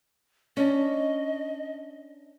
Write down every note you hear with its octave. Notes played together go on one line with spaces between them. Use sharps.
C#4 D4 D#5